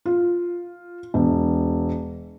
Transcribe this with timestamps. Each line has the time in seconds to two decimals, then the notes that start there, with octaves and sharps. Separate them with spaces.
0.06 F4
1.14 E1